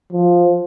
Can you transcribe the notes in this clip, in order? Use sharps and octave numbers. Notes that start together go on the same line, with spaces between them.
F3